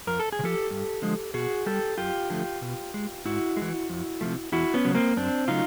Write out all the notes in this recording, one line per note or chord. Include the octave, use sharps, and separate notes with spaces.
F2 A#4
A4
G#4
C3
F3 G4 A4
G2
D3 F3 G#3
B2 F#4 G#4
G3 G4 A4
F#2 F4 G4
D3 F3 A3
B2
G#3
G#2 E4 F#4
E3 G#3
F2
C3 F3 A3
E2 E4 F#4
B3 C#4
C#3 F#3
A#3 C4
F#2 C4 D4
C#3 F#3 A3 D#4 F4